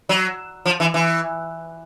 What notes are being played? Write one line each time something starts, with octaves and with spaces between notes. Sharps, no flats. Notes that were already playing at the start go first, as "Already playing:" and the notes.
F#3
F3
E3
E3